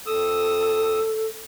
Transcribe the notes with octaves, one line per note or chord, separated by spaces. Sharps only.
F2 A4 D#6 E6